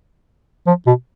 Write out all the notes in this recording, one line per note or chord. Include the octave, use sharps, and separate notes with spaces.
F3
B2